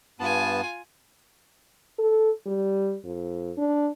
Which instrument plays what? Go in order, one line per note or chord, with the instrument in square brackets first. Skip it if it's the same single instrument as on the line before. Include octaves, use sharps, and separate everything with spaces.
[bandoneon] G2 B3 A5 [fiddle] F4 G#5
[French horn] A4
G3
F2
D4